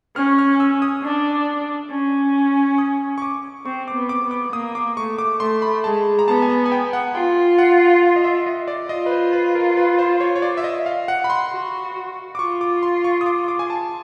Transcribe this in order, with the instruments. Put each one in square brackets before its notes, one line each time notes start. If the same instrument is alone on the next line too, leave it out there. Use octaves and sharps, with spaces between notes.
[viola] C#4 [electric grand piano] F6
[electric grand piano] F6
E6
D#6
[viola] D4
C#4
[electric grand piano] D#6
C#6
D6
[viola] C4 [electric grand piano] C#6
[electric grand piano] D6
[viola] B3
[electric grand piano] D6
[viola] B3
[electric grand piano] D6
[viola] A#3 [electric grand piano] D#6
[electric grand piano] D6
[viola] A3 [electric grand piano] C#6
[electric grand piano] D6
[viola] A3 [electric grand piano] C6
[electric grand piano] B5
[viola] G#3 [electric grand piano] A5
[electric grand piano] A#5
[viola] B3 [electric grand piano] A5
[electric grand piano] G#5
A5
G#5
G5
F#5
[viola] F4 [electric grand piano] G5
[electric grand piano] F#5
F5
D#5
E5
D#5
D5
[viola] F4 [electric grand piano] D#5
[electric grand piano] B4
C5
B4
A#4
B4
C5
C#5
C#5
D5
E5
D#5
F5
F#5
B5
C6
[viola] F#4
[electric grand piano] D6
[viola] F4 [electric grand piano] C#6
[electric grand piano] D6
C6
C#6
D#6
D6
D6
G#5
A5